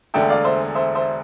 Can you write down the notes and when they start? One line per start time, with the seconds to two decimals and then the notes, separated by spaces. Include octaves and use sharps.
0.14 E1 D2 D3 E5 G5
0.29 D5 F5
0.45 C5 E5
0.75 C5 E5
0.95 C5 E5